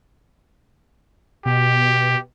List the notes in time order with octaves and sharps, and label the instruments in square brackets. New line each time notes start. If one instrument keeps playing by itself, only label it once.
[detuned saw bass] B2 [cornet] G4